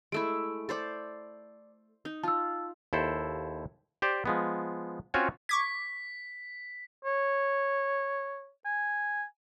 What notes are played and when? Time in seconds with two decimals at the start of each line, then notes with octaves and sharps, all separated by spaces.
0.12 G#3 A3 E4 D7
0.69 A4 C5 D5
2.05 D#4
2.23 F4 A5 E6
2.93 D#2 E4 A4 C5
4.02 G4 C5 D5
4.26 F3 G#3 B3
5.14 C4 C#4 F4 F#4 C#5 G#5
5.49 C#6 D6 G#6 B6
7.05 C#5
8.65 G#5